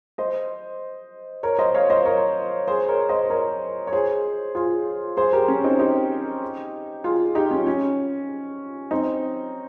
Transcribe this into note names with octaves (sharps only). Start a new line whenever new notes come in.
C5 D#5
A#4 C#5
C5 D#5
C#5 F5
C5 D#5
A#4 C#5
G#4 C5
A#4 C#5
C5 D#5
A#4 C#5
C#5
G#4 C5
F4 G#4
G#4 C5
G4 A#4
C#4
C4 D#4
D#4 G4
F4 G#4
D#4 G4
C#4 F4
C#4
C4 D#4